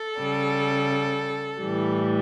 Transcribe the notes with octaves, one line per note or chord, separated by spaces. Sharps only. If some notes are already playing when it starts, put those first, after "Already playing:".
Already playing: A4
C#3 G3
A2 E3 G3